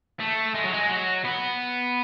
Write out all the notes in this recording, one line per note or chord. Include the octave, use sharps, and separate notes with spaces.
A3
G#3
F#3
G#3
F#3
B3